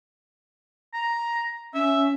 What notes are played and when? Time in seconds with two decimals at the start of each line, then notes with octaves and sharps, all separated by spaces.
0.94 A#5
1.74 C#4 E5